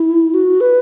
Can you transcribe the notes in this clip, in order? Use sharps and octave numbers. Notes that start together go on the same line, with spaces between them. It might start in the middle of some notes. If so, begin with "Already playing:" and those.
Already playing: E4
F#4
B4